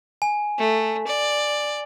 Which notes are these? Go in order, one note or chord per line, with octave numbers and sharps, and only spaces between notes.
G#5
A3
D5